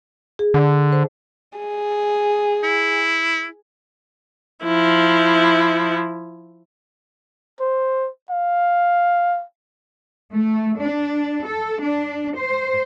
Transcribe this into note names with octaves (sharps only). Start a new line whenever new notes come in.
G#4
D3
C5
G#4
E4
F3 E4
C5
F5
A3
D4
A4
D4
C5